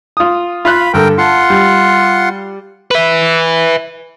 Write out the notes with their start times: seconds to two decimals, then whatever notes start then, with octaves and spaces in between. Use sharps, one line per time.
0.17 F4 D#6
0.65 F4 F5 B5 F#6
0.94 G2 D3 A4 A#4 G5
1.18 F4 F#5 A5 C6
1.50 G3
2.91 B4 E5